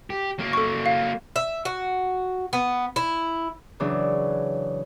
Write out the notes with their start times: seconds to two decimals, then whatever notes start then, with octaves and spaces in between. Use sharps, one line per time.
0.10 G4
0.39 F#3 A#3
0.53 A4 C#6
0.86 F5
1.36 E5
1.65 F#4
2.53 B3
2.96 E4
3.80 C#3 E3 F#3 D4